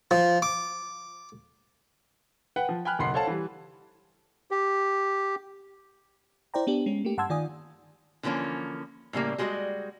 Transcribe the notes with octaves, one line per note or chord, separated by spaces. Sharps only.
F3
D6
B4 F#5 G5
F3
G5 G#5 B5 F6 F#6
F#1 B1 F#5 B5 C6 C7
A4 C5 C#5 F5 F#5 A5
E3 G3
G4
E4 C5 D5 G5 A#5
B3 D4 G4
G#3 C#4
A3 A#3 G4
G2 F#5 A5 C6 E6 G#6
D#3 F4 D5 G#5 D#6
D3 E3 F3 A#3 C#4
A2 C#3 G3 A#3
G3 G#3 F#4 A#4 D#5